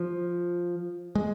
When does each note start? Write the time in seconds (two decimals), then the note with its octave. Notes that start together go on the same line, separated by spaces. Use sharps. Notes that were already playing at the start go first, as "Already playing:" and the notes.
Already playing: F3
1.15 G#3